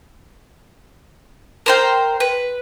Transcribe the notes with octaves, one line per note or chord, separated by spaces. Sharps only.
A#4 C5 G5
B4